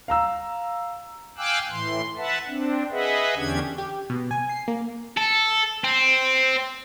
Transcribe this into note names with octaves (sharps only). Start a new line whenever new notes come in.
F5 A#5 E6
F5 G5 G#5 D6 E6 F#6
A2 E3 C6
B4 E5 F#5 A5
C4 D4
G#4 B4 D#5 E5 F#5
E2 D3 C#4 D4 G4 G#6
G4
B2
G#5
C7
A#3
A4
C4